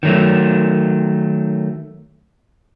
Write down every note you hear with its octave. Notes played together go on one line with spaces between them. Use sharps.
D#3 F#3 A3